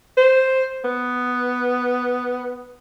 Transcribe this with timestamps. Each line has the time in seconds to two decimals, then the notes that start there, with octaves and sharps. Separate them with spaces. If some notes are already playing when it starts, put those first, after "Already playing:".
0.17 C5
0.84 B3